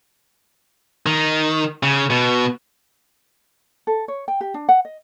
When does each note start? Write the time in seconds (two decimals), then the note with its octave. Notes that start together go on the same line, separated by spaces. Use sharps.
1.06 D#3
1.83 C#3
2.10 B2
3.87 A4
4.08 C#5
4.28 G5
4.41 G4
4.54 D4
4.69 F#5
4.85 D#5